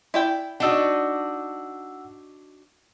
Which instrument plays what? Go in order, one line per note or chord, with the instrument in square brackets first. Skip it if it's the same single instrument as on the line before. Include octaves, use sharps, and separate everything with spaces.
[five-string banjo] E4 D5 G5
[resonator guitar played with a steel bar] D4 D#4 F#4 [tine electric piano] F#5 E6